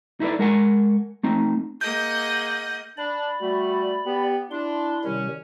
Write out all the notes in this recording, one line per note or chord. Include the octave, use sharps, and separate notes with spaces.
D#4 E4 A4 B4 D5
G#3 A#4 F#5 G#5
A3 C4 D#4
A#3 G#4 D#5 F#5 G6
D4 D5 B5
G3 A3 F#4
B3 G4
D4 E4 C6
C3 D#3 G3 C#4